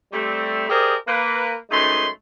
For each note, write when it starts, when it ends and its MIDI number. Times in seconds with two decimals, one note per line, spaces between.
0.12 0.66 55
0.12 0.66 57
0.12 0.66 60
0.69 0.95 67
0.69 0.95 68
0.69 0.95 70
0.69 0.95 72
0.69 0.95 74
0.69 0.95 75
1.07 1.55 58
1.07 1.55 71
1.70 2.07 42
1.70 2.07 56
1.70 2.07 57
1.70 2.07 63
1.70 2.07 71
1.70 2.07 84